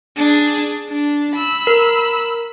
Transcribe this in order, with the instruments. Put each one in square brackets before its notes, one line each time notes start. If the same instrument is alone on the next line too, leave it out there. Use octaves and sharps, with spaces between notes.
[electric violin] D4 G#4
D4
B5 E6
[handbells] A#4